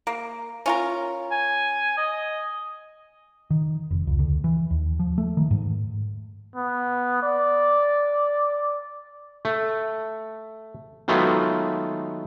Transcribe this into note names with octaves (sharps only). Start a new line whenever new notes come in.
A#3
C#4 F4 A#4
G#5
D#5
D#3
F1
C#2
D2
E3
D#2
F3
A3
D#3
G#2
B3
D5
A3
D#3 F#3 G#3 A3 B3 F4